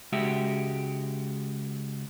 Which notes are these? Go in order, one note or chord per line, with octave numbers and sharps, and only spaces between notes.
C#2 G#3 F#4 G4 E5